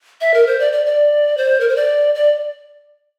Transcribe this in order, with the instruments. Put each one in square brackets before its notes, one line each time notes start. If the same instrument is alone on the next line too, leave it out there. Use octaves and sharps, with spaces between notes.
[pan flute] E5
A#4
C5
D5
D5
D5
C5
A#4
C5
D5
D5